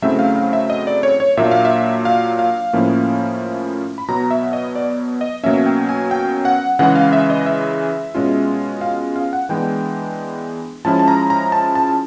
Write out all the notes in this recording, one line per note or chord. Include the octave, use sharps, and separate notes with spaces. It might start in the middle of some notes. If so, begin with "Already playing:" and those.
C#3 F#3 A3 C4 E4 E5
F5
F5
E5
D#5
D5
C#5
C#5
A#2 F#3 A#3 D4 E5
F5
E5
F5
F5
A2 F3 A#3 C#4 E4
B5
B2 F#3 B3 A#5
E5
D#5
D5
D#5
B2 F#3 A#3 C#4 E5
G5
G#5
G5
F#5
C#3 E3 G#3 F#5
F5
E5
D#5
E5
B2 G#3 C#4 F4
F5
F5
F#5
E3 G#3 B3 D4 G5
F3 G#3 C#4 E4 A5
A5
A#5
A#5
A5
A5